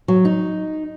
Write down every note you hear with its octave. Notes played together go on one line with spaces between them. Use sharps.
F#3
D#4